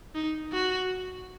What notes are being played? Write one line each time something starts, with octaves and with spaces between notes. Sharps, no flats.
D#4
F#4